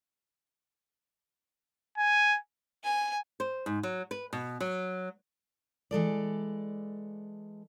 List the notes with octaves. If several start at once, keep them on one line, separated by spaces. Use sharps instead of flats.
G#5
G#5
C5
G#2
F#3
B4
B2
F#3
E3 G#3 A4 D5